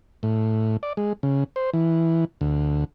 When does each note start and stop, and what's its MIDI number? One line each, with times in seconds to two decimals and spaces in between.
0.23 0.77 45
0.83 0.93 74
0.97 1.13 56
1.23 1.44 49
1.56 1.70 72
1.74 2.25 52
2.41 2.85 38